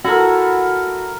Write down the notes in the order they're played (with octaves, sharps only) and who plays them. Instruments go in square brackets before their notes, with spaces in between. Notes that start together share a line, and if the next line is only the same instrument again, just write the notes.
[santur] E4 A4 A#4 [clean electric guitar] F#4